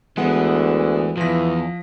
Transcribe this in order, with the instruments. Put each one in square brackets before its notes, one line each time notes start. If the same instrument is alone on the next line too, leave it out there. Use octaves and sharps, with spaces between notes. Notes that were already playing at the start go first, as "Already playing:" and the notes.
[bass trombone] D2 [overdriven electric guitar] E3 [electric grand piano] G#3 B3 F#5
[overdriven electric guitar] E2 [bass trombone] E3 [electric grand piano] F3 A#6